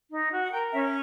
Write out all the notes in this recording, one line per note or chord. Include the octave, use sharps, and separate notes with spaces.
D#4
F#4
F#5
A#4 G5
C#4 E5